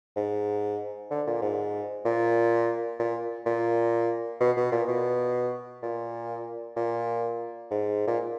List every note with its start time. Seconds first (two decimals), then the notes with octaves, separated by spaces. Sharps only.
0.16 G#2
1.11 D3
1.27 A#2
1.42 G#2
2.05 A#2
2.99 A#2
3.46 A#2
4.40 B2
4.57 B2
4.72 A#2
4.88 B2
5.83 A#2
6.76 A#2
7.71 G#2
8.08 A#2